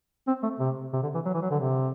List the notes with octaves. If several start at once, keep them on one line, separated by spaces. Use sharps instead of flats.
C4
A3
C3
C3
D3
E3
F#3
E3
F#3
D3
C3